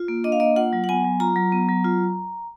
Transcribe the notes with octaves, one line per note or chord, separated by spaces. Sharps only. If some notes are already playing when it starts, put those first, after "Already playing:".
Already playing: F4
A#3
D4 D#5
F5
A#3 D#5
F4 F#5
F#3
F#5
B3 G#5
F#3
F4 A#5
F#3
B3
F#3
F4